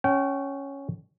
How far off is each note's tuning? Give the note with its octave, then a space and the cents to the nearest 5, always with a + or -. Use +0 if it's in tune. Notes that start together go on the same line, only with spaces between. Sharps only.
C#4 +0 G5 -35